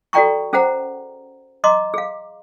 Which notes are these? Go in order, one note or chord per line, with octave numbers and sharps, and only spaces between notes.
F#4 A4 D5 G5 A#5 C#6
C#4 G#4 C5 F#5 A#5
D#5 A#5 C6 D6
G#4 F5